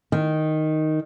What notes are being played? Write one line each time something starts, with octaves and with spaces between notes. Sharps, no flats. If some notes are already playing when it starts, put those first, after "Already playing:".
D#3